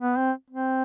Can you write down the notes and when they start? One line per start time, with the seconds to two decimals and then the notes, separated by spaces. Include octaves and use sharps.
0.01 B3
0.17 C4
0.51 C4